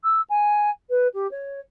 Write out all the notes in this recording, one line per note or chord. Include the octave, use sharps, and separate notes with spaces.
E6
G#5
B4
G4
C#5